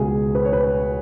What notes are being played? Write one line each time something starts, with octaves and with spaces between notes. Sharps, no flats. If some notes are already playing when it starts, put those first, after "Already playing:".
Already playing: C#2 B2 G#3 G#4
B4
C#5
B4